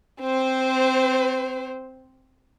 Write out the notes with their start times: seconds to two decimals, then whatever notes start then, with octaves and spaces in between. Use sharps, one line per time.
0.21 C4 C5